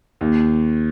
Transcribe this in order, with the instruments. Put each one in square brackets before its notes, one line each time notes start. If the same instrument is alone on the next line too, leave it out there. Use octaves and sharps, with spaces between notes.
[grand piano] D#2